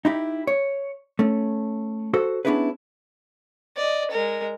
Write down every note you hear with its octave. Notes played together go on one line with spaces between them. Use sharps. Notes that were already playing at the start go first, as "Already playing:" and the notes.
D#4 E4 G4
C#5
A3 C#4
F#4 A4 C5
B3 C#4 D4 E4 G#4 B4
D5 D#5
G#3 A#4